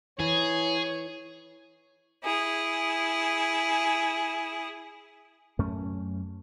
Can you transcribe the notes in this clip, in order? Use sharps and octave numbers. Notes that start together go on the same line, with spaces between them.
E3 G#4 C#5
E4 G#4
F#2 A3 C#4